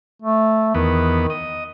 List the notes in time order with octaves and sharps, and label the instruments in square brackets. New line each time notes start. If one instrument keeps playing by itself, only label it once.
[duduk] A3
[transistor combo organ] E2 B3 [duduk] D#3
[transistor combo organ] D#5